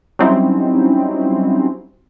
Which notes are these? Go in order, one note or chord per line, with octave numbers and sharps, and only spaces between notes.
F#3 G3 C4 C#4 D#4 E4